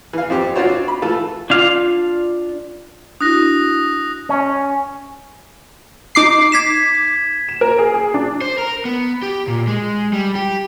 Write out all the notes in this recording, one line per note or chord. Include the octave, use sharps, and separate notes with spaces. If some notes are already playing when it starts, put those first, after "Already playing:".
E3 F5
F2 C4 G4
C4 D4 F4 F#4 C5 C#5
B5
E3 A3 F4 A4
D4 F4 F5
D4 E4 F#4 D#6 F#6 A#6
C#4
D#4 D6 C7
G#6 B6 E7
E7
A#4
G#4
G#4
D4
C5
A#4
B3
G4
A#2
G#3
G3
G4